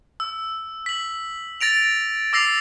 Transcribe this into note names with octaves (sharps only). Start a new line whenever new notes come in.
E6
B6 F#7
A6 A#6 D7 F7
D6 E6 A#6 C7 F7